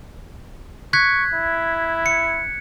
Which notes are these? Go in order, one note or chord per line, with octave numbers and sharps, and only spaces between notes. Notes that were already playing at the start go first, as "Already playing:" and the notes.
C#6 F#6 G#6 B6
E4
C#7